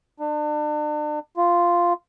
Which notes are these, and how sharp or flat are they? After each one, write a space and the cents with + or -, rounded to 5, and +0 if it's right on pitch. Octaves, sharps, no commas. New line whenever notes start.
D4 +35
F4 -5